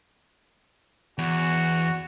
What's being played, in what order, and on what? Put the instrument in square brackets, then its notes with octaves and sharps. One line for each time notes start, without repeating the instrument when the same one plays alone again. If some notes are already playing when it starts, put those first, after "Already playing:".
[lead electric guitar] E2 [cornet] F#4